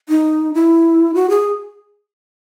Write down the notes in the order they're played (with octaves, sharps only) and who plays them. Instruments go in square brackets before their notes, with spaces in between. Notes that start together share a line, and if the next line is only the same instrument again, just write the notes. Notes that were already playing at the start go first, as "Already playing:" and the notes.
[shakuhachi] D#4
E4
F#4
G#4